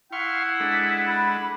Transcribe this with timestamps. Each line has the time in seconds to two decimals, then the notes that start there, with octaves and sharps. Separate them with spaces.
0.13 E4 F5 F#5 C6 C#6
0.60 G#3 D4 A4
1.07 B5